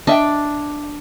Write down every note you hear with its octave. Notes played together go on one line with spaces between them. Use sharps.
D4 D#5 E5 G5